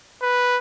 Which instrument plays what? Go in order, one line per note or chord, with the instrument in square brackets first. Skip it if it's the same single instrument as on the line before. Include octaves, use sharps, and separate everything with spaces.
[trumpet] B4